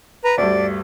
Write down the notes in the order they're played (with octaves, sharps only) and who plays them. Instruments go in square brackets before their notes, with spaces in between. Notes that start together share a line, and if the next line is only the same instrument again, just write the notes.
[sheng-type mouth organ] B4 A#5
[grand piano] D2 G2 [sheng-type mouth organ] D5